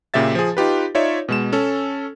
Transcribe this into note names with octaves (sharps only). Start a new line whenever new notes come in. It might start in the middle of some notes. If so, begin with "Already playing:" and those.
A#2 C#3 G4 E5 A6
F3 G#4
D#4 F4 G4 B4
D#4 F4 C#5 D5 E5
B2 G#3 E7
C#4 A4